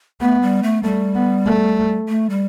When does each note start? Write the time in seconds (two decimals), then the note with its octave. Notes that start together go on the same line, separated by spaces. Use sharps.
0.21 A3 B3
0.42 G3
0.63 A3
0.83 G3 A3
1.15 B3
1.46 A3
2.08 A3
2.30 G3